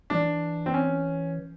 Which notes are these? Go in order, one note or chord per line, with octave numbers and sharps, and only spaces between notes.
E3 D4
C4
C#4